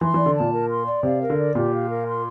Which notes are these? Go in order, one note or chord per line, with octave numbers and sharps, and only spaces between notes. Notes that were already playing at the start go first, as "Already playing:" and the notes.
E3 C6
E3 D5
D3
A#2 A5
A#4
C6
D5
C3 F5
A#4
D3
D5
A#2 G4
F5
A#4
C6